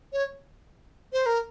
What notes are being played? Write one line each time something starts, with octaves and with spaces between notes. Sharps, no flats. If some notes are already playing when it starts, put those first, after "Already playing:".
C#5
C5
A#4